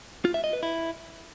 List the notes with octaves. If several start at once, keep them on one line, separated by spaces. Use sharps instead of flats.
F4
E5
D#5
B4
E4